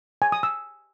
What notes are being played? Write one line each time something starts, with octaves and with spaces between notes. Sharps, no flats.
G#5
D#6
E6